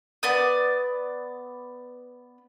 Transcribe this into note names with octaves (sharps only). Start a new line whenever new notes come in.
B3 D5 D#6